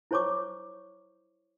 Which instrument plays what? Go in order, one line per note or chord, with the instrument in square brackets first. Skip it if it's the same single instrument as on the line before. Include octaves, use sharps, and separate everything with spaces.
[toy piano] E4 C5 C#5 C#6 D6